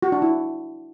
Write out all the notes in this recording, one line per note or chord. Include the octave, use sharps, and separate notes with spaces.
F#4
D4
E4